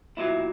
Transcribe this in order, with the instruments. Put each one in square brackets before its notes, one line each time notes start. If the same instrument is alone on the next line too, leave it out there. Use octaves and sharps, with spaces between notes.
[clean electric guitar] B1 A#2 F#3 A#3 E4